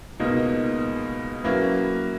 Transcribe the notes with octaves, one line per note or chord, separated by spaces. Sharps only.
C#2 B2 A#3 D#4
F#3 A#3 C#4 E4 B4